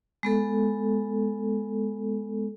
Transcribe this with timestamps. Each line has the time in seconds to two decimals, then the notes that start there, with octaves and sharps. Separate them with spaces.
0.23 G#3 B3 A4